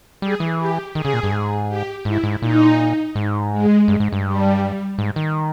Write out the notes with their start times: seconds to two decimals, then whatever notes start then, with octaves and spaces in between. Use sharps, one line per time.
0.22 G3 G#4
0.40 E3
0.58 G4
0.95 D#3 G#4
1.05 C#3
1.14 A#2
1.23 G2
1.32 G#2
1.68 G4
2.05 G#2 E4
2.24 G#2
2.42 A#2 D#4
3.15 G#2
3.51 G#3
3.88 G2
4.00 G#2
4.12 G2
4.25 G3
4.98 G#2
5.16 D#3